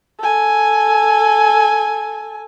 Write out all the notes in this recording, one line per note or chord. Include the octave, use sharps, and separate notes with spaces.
A4 G#5